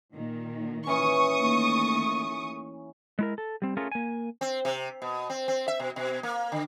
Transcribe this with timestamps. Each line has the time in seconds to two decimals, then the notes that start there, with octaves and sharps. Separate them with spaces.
0.12 A#2 D#3
0.87 E3 C#4 C#6 D#6
1.39 D#2 A3 A#3
3.19 G#3 E4 A#4
3.38 A4
3.62 G3 C4
3.77 A3 C#4 F4 G#4 A#4
3.92 A#3 G#5
4.41 C4
4.65 C3
5.02 B2
5.30 C4
5.48 C4
5.68 E5
5.79 B2
5.96 B2
6.23 A#3
6.52 D3